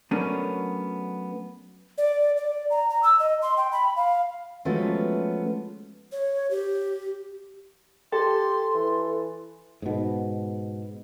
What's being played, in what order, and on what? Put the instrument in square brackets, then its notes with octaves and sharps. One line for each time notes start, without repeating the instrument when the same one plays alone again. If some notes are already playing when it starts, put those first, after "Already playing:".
[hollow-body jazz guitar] F#3 A3 B3 C#4 D4 A#4
[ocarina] D5
D5
A#5
A#5
E6
D#5
C6
G5
B5
F5
[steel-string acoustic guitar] F3 F#3 G#3 A3 B3 C#4
[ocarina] C#5
G4
[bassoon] G4 [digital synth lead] A4 [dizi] C6
[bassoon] E3
[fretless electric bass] G#2 B2